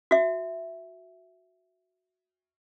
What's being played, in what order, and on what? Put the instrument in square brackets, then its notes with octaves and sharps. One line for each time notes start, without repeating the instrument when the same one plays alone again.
[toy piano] F#4 E5